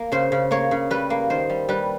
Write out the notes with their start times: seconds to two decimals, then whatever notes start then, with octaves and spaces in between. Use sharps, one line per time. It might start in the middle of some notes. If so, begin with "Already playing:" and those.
Already playing: A#3
0.12 C#3 C5
0.32 C#3
0.51 A#3 C#5
0.71 C#3
0.90 G3 B4
1.10 A#3
1.30 D#3 C5
1.50 G3
1.69 G3 B4